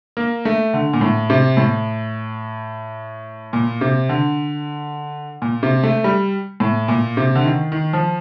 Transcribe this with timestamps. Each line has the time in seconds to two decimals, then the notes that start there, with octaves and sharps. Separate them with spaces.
0.17 A#3
0.45 A3
0.74 D3
0.93 A#2
1.01 A2
1.30 C3
1.57 A2
3.53 A#2
3.81 C3
4.09 D3
5.42 A#2
5.63 C3
5.83 A3
6.04 G3
6.60 A2
6.88 A#2
7.17 C3
7.35 D3
7.45 D#3
7.72 D#3
7.93 F3